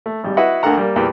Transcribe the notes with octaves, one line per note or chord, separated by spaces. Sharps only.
A3
G#1 G3
E4 F#4 B4 D#5 E5 F#5
D2 D3 A#3 A4 F#5 A#5
G3 A#3
E2 A#2 E3 G4